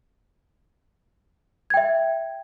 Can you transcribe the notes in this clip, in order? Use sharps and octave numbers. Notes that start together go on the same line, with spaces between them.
E5 G5 G#6